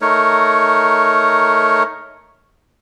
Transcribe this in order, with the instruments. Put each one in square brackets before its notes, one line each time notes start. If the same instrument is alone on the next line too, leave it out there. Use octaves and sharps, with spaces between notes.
[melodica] A3 D#4 A#4 C#5